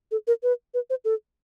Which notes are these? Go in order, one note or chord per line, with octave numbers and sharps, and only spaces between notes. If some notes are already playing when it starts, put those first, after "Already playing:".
A4
A#4
B4
B4
C5
A4